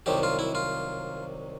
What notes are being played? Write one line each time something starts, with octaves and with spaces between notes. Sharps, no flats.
C2 C3 D#3 F#3 G4
F4
E4
F4